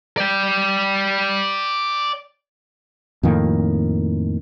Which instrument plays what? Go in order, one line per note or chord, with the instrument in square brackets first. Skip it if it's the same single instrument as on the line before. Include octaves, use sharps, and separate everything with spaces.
[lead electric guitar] D5 G5
[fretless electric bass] F2 A2 D#3 A#3